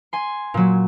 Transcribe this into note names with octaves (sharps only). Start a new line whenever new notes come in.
G#5 C6
A#2 F#3